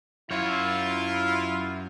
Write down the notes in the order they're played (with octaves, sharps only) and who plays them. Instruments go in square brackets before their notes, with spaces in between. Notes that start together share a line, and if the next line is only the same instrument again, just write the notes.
[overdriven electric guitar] F#2 C#5 [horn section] E4 F4